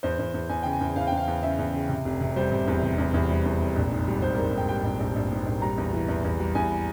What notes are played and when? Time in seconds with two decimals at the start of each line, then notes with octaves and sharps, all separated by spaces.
0.03 E2 C5
0.19 E2
0.34 E2
0.49 E2 G#5
0.63 C#3 G5
0.73 G#5
0.81 E2
0.96 E2 F5
1.07 E2 G5
1.17 F5
1.27 E2
1.43 C#3 E5
1.59 E2
1.74 C#3
1.89 C3
2.05 F1
2.21 C3
2.36 G3 C5
2.52 C3
2.67 E2
2.83 C3
2.98 E2
3.14 E2
3.29 G3
3.45 E2
3.61 F1
3.76 A#1
3.92 G#2
4.07 G3
4.22 G3 C5
4.34 A#4
4.38 G#2
4.53 G#2 G5
4.69 G3 G5
4.84 A#1
5.00 A#1
5.16 A#1
5.31 G#2
5.46 A#1
5.62 G3 A#5
5.78 E2
5.93 E3
6.08 E2
6.24 E2
6.40 G3
6.55 E2 G#5